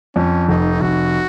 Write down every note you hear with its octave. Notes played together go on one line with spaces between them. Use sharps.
F2 C#4
F1 D#4
F1 F#4